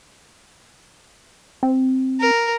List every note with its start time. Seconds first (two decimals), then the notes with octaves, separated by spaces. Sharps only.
1.63 C4
2.20 A#4